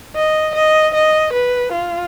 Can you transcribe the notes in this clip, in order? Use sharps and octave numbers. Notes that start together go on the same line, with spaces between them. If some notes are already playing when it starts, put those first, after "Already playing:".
D#5
D#5
D#5
B4
F4